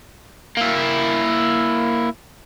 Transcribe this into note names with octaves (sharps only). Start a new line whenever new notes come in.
A#3 E4